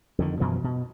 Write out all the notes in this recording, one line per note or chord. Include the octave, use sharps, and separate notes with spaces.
F2 D3 D#3
F#2 B2 E3 F3
B2